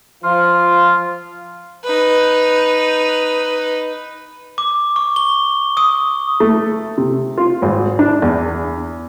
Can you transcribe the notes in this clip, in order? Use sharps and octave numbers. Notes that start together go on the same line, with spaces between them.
F3 F4
D#4 B4
D6
C#6
G7
D#6
A3
C3
F4
G#1
D4
E2